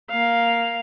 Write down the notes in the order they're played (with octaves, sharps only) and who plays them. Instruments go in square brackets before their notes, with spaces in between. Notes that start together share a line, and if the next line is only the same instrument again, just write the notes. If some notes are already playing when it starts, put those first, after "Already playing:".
[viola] A#3 F5